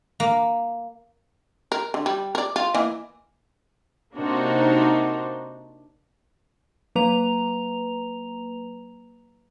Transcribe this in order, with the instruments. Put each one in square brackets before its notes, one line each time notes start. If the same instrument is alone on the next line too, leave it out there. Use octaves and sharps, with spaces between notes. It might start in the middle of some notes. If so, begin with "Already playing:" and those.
[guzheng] A#3
[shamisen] A#4
D3
G3
A#4 D5
F4
E3 A#3 D#5
[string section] C3 A#3 D4 D#4 F#4 C5
[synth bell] F#3 A#3 B4 A#5 F7